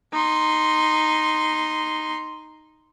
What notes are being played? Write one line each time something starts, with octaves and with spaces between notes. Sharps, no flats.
D#4 C6